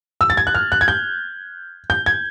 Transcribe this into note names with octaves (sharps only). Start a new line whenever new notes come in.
E6
A6
G#6
F#6
F6
F#6
G#6
G6
G6
G#6